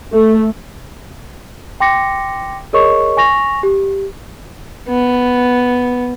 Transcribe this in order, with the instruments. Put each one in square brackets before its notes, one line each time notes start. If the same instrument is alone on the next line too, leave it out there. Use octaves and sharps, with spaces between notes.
[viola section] A3
[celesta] G5 C6 D6 A#6 C#7
G#4 A#4 C#5 D#5 C#6
G#5 C#6 A#6 F7
G4
[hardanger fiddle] B3